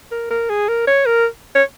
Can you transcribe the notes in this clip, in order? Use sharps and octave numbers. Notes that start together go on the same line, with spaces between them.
A#4
A#4
G#4
A#4
C#5
A#4
C#5